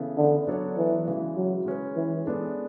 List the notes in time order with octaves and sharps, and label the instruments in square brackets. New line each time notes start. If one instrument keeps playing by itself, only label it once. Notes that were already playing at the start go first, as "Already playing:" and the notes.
Already playing: [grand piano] C#3 E3 B3 E4 A4
[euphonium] D3
[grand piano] F#3 B3 D4 A4 C#5
[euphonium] E3
[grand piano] C#3 E3 G#3
[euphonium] F#3
[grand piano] G#3 C#4 G#4 B4
[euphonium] E3
[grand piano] G#3 B3 D4 A4